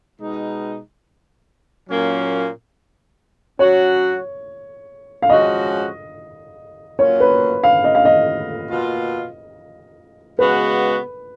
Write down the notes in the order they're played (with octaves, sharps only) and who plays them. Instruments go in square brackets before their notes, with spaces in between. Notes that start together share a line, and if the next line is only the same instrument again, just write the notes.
[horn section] B2 G#3 D#4
A#2 F#3 A#3 C#4
[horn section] F#3 C#4 F#4 [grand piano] C#5
[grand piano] F5
[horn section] F3 G#3 C#4 F#4 [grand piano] D#5
[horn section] F#3 A#3 C#4 F4 [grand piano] C#5
[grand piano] B4
F5
D#5
F5
D#5
[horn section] B2 A#3 F4
[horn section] C#3 G#3 B3 F#4 [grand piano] B4